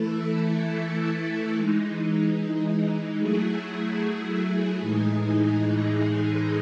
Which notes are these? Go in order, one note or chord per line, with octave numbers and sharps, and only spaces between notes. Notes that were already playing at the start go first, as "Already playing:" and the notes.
Already playing: E3 A3 E4 A4
E3 G#3 D#4
F#3 A3 E4 G#4
A2 E3 G#3 D#4 G#4